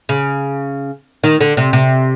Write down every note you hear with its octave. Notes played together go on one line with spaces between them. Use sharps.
C#3
D#3
D3
C3
C3